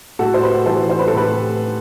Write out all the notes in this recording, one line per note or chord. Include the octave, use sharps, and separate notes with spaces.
A2 F#4 A4
C5
G4 B4
E3 A4 C5
C5
B4
A4
A2 G4 B4